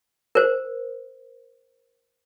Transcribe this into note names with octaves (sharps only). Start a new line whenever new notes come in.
A#4 C5